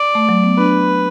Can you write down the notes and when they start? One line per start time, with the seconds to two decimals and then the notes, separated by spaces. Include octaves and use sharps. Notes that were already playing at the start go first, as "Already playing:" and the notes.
Already playing: D5
0.15 A3
0.29 F#3
0.44 B3
0.58 D4 B4